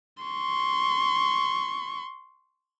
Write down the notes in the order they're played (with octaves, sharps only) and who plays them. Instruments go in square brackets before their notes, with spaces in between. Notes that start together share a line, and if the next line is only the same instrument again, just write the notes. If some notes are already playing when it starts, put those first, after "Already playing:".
[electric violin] C6 C#6